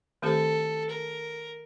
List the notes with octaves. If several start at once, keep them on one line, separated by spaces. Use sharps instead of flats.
D#3 A3 C4 G4 A4 C5
A#4